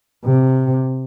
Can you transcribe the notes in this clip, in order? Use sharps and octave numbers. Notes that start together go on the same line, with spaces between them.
C3